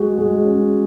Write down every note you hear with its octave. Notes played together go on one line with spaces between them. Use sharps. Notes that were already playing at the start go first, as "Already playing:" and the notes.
Already playing: G#3 F#4
G#3
C#4